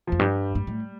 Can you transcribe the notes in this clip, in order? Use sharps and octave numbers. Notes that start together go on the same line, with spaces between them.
F2 F3
G2 G3
G2
A2